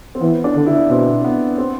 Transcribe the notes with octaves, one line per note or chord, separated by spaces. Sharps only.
C4
E3 B3
D4
D3
E4
B2 C4
B3
C4